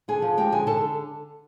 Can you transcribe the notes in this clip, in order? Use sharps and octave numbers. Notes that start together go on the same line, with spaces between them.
D3 G#4 G#5
F3
G#3 G4 G5
D3 G#4 G#5
D3 A4 A5